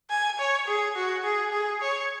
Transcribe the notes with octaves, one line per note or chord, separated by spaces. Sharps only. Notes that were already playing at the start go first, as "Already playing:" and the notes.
G#5
C#5
G#4
F#4
G#4
G#4
C#5